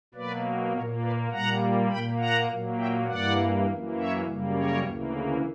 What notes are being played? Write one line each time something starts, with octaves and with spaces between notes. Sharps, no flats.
B2 F#3 A#3 B4 D5
A#2 A#3 A#4 C#5
B4 D5
A#2 G3 A#3 F#5 A#5
A#2 A#3 G5 B5
F#5 A#5
A#2 F#3 A#3
E5 G5
G2 E3 A#3 D5 F#5
F#2 E3 A#3
C#5 E5
F#2 C#3 G3 A#3
A#4 C#5
D2 C#3 E3 A#3